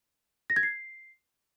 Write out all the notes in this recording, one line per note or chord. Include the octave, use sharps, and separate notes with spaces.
A#6
G#6
C7